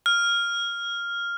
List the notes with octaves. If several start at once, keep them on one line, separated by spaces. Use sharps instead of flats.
F6